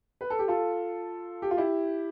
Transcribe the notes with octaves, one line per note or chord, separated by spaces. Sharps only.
B4
A4
G4
F4 A4
G4
F4
E4 G4